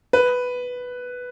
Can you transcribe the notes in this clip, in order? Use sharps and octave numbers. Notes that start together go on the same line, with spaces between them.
B4